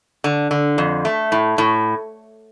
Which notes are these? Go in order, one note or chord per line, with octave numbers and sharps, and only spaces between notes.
D3
D3
F2
A3
A2
A2